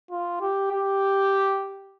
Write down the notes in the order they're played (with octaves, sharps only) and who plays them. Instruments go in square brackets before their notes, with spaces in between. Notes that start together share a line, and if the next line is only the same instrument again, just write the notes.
[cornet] F4
G4
G4